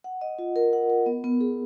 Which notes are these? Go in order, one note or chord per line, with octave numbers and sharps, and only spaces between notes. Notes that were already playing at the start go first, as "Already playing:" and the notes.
F#5
D#5
F4
A#4
F#5
A#4
B3
B3
G#4